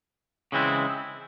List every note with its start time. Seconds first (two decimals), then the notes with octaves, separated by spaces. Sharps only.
0.52 C#3 E3 G#3 C4 E4